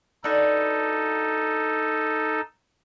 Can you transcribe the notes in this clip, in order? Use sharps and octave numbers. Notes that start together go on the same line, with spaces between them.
D4 D#4 F#4 A4 B4